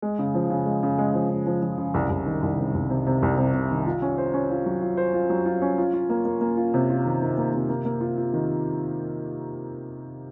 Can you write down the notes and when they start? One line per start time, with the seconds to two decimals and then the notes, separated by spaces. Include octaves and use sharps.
0.02 G#3
0.19 C#3
0.34 F3
0.50 C#3
0.66 G#3
0.83 C#3
0.98 G#3
1.14 F3
1.30 C#3
1.46 F3
1.63 F3
1.78 C#3
1.94 C2
2.10 C2
2.26 D#3
2.42 C2
2.58 C3
2.74 C2
2.90 C3
3.07 C3
3.22 C2
3.38 C3
3.54 C3
3.70 D#3
3.86 F4
4.02 C#4
4.18 C5
4.34 C#4
4.50 F4
4.66 F#3
4.81 F4
4.97 C5
5.14 F4
5.30 F#3
5.46 F4
5.62 C#4
5.78 F4
5.93 F4
6.09 A#3
6.25 A#3
6.41 A#3
6.57 F4
6.74 C3
6.90 F4
7.05 D#3
7.22 D#3
7.38 A#3
7.54 C3
7.69 A#3
7.85 A#3
8.01 F4
8.18 F4
8.33 D#3